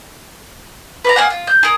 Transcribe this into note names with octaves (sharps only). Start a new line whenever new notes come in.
B4 D5 A#5
A#3 D4 G#4 F#5
F4
G6
G#4 A#4